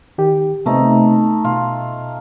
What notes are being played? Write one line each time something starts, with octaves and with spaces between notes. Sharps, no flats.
D#3 G4
C3 A3 B3 C4 D#4
B2 F4